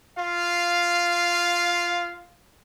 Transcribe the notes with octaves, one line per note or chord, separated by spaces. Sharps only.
F4 F5